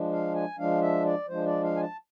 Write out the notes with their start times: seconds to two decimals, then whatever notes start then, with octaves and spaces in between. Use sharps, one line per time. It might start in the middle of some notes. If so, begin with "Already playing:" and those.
Already playing: F3 G#3 D4
0.12 F5
0.35 G#5
0.59 F3 G#3 D4 F5
0.82 E5
1.05 D5
1.29 F3 G#3 D4 C5
1.46 D5
1.63 F5
1.76 G#5
1.81 A5